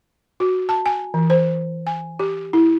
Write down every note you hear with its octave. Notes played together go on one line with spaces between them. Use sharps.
F#4
A5
G#5
E3
C5
G#5
G4
E4